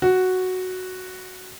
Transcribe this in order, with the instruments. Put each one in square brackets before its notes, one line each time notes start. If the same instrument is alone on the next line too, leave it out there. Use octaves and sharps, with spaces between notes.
[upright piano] F#4